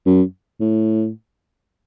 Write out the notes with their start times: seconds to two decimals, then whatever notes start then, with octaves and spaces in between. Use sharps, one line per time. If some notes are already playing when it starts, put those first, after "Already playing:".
0.06 F#2
0.60 A2